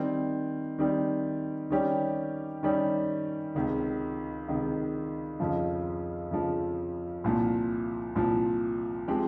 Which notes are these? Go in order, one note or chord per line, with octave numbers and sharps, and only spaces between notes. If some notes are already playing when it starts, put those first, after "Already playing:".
Already playing: D#3 G3 C4
D#3 G3 C4
D#3 G3 C#4 G4
D#3 G3 C#4 G4
C#2 C3 D#3
C#2 C3 D#3
F2 C#3 F3
F2 C#3 F3
C2 A#2 F3
C2 A#2 F3
F3 G#3 C4 G4